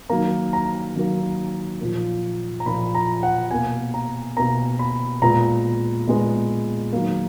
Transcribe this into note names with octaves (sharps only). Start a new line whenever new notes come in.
D#3 F#3 A#3 A#5
A#5
D#3 F#3 A#3
A#2 F3 A#3
A#5
A#2 F3 A#3 B5
A#5
F#5
B2 A#3 G#5
A#5
B2 A#3 A#5
B5
A#2 G#3 B3 A#5
A#2 G#3 B3
D#3 F#3 A#3